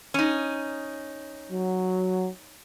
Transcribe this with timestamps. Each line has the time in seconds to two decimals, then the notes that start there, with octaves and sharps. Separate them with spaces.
0.14 C#4 D#4
1.51 F#3